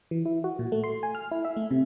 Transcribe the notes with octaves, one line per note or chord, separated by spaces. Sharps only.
E3
E4
F#4
A#2
A3
C6
G#5
F6
E4
E5
A3
C3